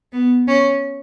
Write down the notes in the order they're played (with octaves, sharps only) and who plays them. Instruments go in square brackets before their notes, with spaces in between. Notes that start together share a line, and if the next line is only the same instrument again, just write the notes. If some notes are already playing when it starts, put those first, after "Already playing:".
[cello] B3
C#4